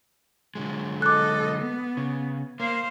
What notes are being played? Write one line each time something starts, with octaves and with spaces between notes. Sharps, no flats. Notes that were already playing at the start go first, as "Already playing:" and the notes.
D3 F#3 G#3
A4 D#5 D6 F#6
B3
C#3
A#3 C5 F5